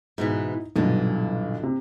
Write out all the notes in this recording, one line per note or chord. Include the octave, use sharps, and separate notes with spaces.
G#2 B2 E3 D#4
B1 G2 A#2 D3 E3
C3